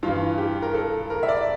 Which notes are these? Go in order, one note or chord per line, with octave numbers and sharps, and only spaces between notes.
G2 E3 F4
G4
A#4
A4
A#4
E5
D5